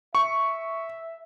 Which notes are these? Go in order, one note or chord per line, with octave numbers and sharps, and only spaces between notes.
E5 C#6